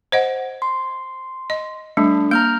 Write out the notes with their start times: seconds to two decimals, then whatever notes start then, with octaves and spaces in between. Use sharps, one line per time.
0.12 C5 D#5 F#5
0.62 C6
1.50 D#5
1.97 G3 A3 D4
2.31 A#3 A#5 F6 G6